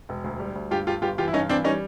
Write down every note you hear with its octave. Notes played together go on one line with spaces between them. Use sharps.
E1
D2
G3
D2
G2 F4 G4
G2 F4 G4
G1 F4 G4
E3 F4 G4
E4
G2 C#4 D#4
E3 C4 D4
G3 C#4 D#4